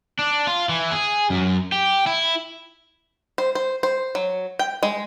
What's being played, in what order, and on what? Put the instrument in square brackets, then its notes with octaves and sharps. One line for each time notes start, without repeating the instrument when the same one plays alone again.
[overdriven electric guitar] D4
F4
E3
G#4
F#2
G4
E4
[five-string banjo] C5
C5
C5
F#3
G5
G#3